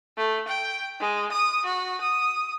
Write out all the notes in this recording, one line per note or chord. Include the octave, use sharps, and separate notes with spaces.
A3
G5
G#3
D#6
F#4
D#6